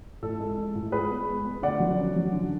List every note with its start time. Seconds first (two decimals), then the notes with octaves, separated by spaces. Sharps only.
0.22 A2 A4
0.40 G#3
0.57 G#3
0.75 A2
0.92 G#3 G#4 B4
1.10 B3
1.28 G#3
1.45 B3
1.62 D2 D5 F#5
1.80 F#3
1.98 C#4
2.16 F#3
2.33 D3